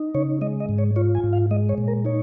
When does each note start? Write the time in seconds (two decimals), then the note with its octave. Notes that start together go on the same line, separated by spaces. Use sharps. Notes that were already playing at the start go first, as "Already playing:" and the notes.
Already playing: D#4
0.15 C#3 C#5
0.41 G#3 D#5
0.60 D#5
0.69 G#2
0.78 C#5
0.96 F4 C#5
1.15 G#5
1.24 G#2
1.33 F5
1.51 G#3 D#5
1.69 C#5
1.78 A#2
1.88 A#4
2.05 D#4 C#5